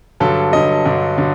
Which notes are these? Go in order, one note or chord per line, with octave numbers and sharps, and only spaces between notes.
G2 D3 F#3 A4
G2 D3 F#3 D#5
G2 D3 F#3
D3 F#3